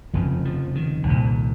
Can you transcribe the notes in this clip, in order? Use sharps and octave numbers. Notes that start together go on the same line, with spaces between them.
F1 F2 C#3 F3
F3
D#3
C2 A#2